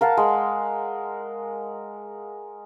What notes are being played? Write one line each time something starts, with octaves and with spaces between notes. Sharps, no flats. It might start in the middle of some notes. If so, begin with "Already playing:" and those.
A#4 F5 F#5 A5
G#3